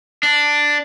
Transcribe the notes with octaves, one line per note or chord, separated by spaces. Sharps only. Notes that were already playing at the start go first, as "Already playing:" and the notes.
D4